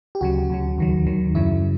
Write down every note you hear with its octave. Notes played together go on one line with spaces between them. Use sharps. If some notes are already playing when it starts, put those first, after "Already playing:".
G4
D2 C#3 F#3 F#4
D2 C#3 F#3
D#2 D#3 F#3
D#2 D#3 F#3
F#2 C#3 F#3 E4